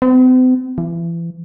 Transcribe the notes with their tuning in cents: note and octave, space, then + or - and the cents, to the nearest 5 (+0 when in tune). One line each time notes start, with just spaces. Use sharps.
C4 -45
E3 +35